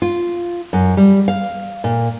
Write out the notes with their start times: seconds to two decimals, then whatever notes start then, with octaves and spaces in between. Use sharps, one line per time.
0.02 F4
0.73 F#2
0.97 G3
1.28 F5
1.84 A#2